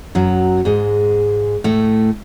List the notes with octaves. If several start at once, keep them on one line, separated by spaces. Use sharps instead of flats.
F#2 F#3
G#2 G#3
A2 A3